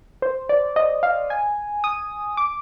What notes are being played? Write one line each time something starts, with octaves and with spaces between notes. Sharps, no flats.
C5
D5
D#5
F5
G#5
D#6
D6